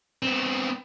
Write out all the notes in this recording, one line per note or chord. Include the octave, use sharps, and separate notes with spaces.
B3 C4